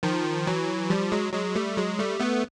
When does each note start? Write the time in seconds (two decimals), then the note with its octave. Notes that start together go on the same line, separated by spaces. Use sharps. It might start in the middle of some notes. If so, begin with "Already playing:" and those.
0.03 D#3 F3
0.47 E3 F#3
0.90 F3 G3
1.12 F#3 G#3
1.33 F#3 G#3
1.56 G3 A3
1.77 F#3 G#3
1.99 G3 A3
2.20 A3 B3